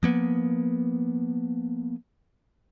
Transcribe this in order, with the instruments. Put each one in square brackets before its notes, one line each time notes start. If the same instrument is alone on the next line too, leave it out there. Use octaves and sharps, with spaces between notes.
[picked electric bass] F3 A#3 B3